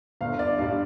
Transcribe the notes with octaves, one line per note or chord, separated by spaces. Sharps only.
G1 F5
D5
D5
G2 G3 F5